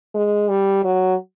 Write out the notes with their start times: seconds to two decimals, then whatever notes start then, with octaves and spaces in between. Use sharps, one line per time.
0.15 G#3
0.49 G3
0.84 F#3